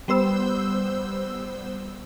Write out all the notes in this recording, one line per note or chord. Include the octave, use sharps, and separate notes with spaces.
G3 B3 C5 E6